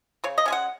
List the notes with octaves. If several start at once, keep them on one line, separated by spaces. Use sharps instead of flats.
C#3 C#5
D#5
G#3 C#4 F#5 G#5